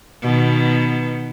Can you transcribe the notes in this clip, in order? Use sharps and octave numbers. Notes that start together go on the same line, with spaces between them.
B2 D#3 B3